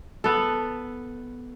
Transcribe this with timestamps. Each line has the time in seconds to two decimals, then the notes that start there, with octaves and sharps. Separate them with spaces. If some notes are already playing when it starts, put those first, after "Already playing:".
0.24 B3 A4